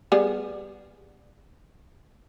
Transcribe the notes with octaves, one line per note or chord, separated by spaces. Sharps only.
G3 B3 G#4